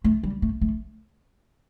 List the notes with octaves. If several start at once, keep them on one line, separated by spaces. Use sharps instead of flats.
A3
G3
A3
A3